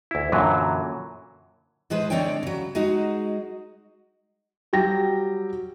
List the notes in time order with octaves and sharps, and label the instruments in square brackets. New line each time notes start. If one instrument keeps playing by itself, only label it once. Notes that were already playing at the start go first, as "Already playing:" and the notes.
[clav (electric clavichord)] D2 E4
F#2 A#2 D3 E3 F#3
[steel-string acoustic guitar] A2 G#3 G#4 B4 C5
D3 G#3 C4 D4 C#5 G5
C#3 F#3
F#3 G#3 D#4 F#4
[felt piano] F#3 G3 G5 A#6